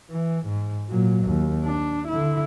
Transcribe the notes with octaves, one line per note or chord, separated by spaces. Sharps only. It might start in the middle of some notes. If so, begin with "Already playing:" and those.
E3
G#2
A#2 F#3
D#2
D4
D3 E4